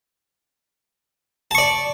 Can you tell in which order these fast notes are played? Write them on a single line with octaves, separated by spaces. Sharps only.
A5 C#6 D5